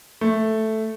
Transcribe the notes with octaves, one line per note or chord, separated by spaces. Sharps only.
A3